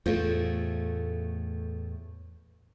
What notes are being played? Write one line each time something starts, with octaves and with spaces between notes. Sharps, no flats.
E2 A2 A3 F4 C5